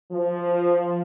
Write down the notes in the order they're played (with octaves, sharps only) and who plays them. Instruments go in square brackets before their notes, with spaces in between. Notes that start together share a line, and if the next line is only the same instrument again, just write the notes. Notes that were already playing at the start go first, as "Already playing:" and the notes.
[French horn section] F3